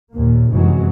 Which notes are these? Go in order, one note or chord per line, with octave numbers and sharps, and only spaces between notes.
D#2 A#2 A#3
F1 F#2 C3 E3 F#3 G#3